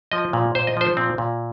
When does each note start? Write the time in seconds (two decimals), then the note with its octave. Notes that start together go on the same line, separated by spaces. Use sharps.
0.12 F3 D#5
0.33 A#2
0.55 A#2 C5
0.67 D#5
0.77 F3 C5
0.97 A#2 C4
1.18 A#2